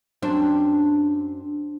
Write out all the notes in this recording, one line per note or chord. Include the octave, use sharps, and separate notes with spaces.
F#2 C4 D4